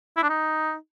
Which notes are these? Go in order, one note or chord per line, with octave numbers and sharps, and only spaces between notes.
E4
D4
D#4